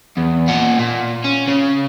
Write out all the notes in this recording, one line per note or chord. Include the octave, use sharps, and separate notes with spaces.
E2
A#2 F#5
A#2
C#4
C#3